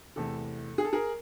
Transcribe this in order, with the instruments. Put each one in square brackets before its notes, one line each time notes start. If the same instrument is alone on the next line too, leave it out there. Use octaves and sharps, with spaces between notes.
[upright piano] E2 C3 E3 A3 A4
G#4
A4
G#4 A#4